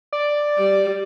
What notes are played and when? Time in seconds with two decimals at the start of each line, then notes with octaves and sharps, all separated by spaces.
0.13 D5
0.58 G3